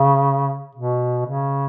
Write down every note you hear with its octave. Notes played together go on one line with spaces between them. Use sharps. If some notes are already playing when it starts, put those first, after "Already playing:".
Already playing: C#3
B2
C#3